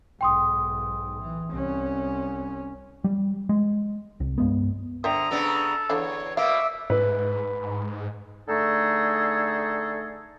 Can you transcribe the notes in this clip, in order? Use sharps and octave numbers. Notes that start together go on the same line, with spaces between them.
B1 G#2 G5 C6 D#6
E3
C2 C#4
G3
G#3
C2
G2 G#3 B3
D3 C5 E5 G5 A#5 D#6
C#3 B3 D4 A4
E2 D3 C#5 F5 B5
B2 A#3 E5 F5 D6
G#2 B4
D3 A3 D#4 G#4 A4